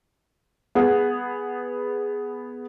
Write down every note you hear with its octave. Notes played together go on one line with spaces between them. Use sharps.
B3 G#4 F#5